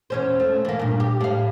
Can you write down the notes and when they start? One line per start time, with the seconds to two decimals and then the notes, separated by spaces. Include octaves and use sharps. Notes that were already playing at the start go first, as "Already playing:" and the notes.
0.10 E2 C#4 C5
0.40 A3
0.65 E3 A#3
0.79 G2 A#2
1.00 G4
1.21 A2 F5